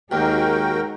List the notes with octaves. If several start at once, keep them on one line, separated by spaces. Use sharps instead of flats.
D#2 G#3 D#4 F#4 G#4 A#4 G5